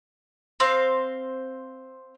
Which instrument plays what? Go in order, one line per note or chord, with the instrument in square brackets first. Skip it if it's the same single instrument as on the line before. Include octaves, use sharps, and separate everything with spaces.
[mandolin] C4 C5 F5